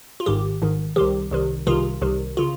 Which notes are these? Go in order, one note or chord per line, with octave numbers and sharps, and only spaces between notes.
F4
G#1 G#2 D#3 G4
G#1 G#2 D#3
C2 C3 D#3 G4
C2 C3 D#3
C2 C3 D#3 F4 G#4
C2 C3 D#3
C#3 F4